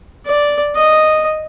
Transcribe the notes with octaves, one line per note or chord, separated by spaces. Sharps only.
D5
D#5